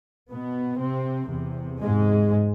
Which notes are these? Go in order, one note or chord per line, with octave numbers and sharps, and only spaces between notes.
B2 B3
C3 C4
E2 C3
G#2 G#3